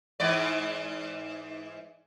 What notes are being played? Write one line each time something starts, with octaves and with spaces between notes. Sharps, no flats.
G#2 E3 D5